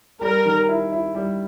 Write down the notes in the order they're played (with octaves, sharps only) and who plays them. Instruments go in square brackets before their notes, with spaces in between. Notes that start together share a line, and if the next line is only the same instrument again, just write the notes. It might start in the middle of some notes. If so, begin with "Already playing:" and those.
[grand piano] G3 [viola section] A#4
[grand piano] D#3
E4
E4
G3